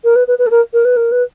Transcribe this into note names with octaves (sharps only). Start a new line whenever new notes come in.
A#4
B4
B4
B4
A4
A#4
A#4
B4
A#4
B4